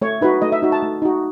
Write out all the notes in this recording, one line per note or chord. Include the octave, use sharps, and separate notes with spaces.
A3 C#5
D#4 F#4 B4
A3 D#5
E5
D#4 F#4
A5
A3
D#4 F#4